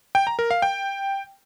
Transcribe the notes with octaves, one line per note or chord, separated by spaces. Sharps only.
G5
A#5
A#4
F5
G5